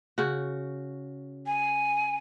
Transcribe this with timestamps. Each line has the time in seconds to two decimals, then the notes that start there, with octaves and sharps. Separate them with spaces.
0.18 C#3 F#4
1.46 G#5